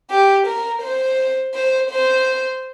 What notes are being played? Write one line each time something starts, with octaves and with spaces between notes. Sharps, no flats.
G4
A#4
C5
C5
C5